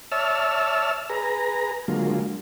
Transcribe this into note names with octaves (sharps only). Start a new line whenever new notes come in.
C#5 D5 E5 A5 E6 F6
G#4 B4 A#5
D3 F#3 G#3 A#3 F4